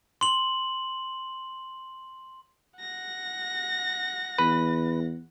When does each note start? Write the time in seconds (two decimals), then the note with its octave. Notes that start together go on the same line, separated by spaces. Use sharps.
0.21 C6 F#7
2.80 F#5 A#6
4.38 E2 B4